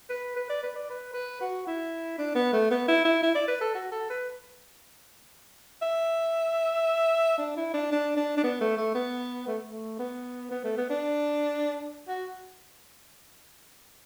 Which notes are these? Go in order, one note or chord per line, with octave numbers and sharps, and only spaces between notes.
B4
B4
D5
B4
D5
B4
B4
F#4
E4
D4
B3
A3
B3
E4
E4
E4
D5
B4
A4
F#4
A4
B4
E5
D4
E4
D4
D4
D4
D4
B3
A3
A3
B3
A3
A3
B3
B3
A3
B3
D4
F#4